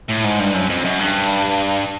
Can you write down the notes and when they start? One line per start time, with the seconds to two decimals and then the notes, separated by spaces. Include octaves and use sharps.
0.09 A2
0.24 G#2
0.39 G2
0.54 F#2
0.70 F2
0.85 F#2
1.00 G2